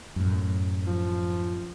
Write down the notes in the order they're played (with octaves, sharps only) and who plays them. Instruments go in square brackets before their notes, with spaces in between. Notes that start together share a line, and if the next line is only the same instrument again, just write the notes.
[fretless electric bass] F#2 A2
[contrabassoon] F3